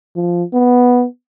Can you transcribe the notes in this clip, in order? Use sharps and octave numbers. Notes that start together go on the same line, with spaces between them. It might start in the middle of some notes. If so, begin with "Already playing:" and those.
F3
B3